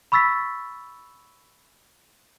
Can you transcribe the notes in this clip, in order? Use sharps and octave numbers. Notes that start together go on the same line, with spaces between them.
B5 C#6 E6 A6 B6